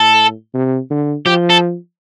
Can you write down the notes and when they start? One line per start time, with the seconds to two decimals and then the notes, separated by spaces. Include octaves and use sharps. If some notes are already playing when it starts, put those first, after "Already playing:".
Already playing: A2 A4
0.54 C3
0.90 D3
1.26 F3 G4
1.50 A4